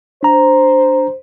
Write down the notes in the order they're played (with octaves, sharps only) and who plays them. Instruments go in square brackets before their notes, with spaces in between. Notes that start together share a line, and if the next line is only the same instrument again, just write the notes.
[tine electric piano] D4 A#5 [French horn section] C5